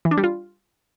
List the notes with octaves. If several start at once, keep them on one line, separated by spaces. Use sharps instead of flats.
E3
D4
G3
F4